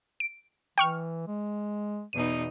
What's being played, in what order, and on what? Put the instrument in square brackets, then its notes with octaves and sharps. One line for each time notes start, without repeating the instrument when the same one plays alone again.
[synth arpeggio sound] D7
[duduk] E3 [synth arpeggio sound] G5 C#6 F6
[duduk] G#3
[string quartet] E2 B2 D#4 [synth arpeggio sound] D#7